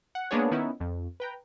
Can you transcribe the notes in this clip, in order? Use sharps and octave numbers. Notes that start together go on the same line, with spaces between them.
F#5
G#3 A#3 B3 D4 G#4 C#5
D#3 B3 C#4 D#4 E4
F2
B4 G5 A#5